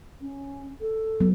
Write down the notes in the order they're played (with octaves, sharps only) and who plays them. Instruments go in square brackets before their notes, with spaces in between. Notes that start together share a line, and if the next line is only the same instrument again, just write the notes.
[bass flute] C#4
A4
[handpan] F#3 B3